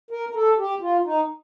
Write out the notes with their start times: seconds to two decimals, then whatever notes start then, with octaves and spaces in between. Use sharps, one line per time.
0.11 A#4
0.29 A#4
0.34 A4
0.59 G4
0.81 F4
1.05 D#4